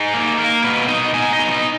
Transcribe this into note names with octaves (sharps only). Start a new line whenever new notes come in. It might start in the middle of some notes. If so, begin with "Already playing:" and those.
Already playing: D#4 G#4
A#3
A#3 A#4
B2 B4
D#4 D#5
D#4 G#5
D#5
B2
D#5